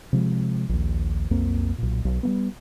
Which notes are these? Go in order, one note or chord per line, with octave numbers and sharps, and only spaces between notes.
C3 F3 G#3
A#1 D#2
B1 F2 A#3 C4
B1 A#2
B1
G3 A#3 B3